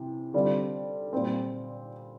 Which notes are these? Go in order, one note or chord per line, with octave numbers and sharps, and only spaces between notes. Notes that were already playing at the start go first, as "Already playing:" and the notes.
Already playing: C3 E3
D3 G3 C4 F4
A#2 G3 C4